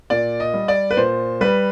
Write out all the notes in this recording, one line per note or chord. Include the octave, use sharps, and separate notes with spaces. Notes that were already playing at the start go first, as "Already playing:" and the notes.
A#2 D5
D#5
G3
D5
B4
A#2 C5
G3 B4